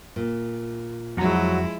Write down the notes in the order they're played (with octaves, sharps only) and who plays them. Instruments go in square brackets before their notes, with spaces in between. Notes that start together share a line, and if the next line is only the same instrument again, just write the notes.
[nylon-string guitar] A#2
[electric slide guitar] F2 F#4 A#5 [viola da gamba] F3 G#3 E4 [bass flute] F#3